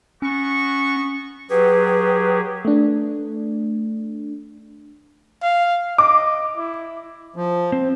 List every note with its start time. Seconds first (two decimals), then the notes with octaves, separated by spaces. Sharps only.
0.22 B3 C#4 F#4 C#6
1.50 F#3 G4 G#4 B4
2.65 A3 D4
5.43 F5
5.98 D#5 D6
6.57 E4
7.36 F3
7.72 C4